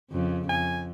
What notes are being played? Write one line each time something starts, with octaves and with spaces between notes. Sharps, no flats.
F2 C#3
F2 G#5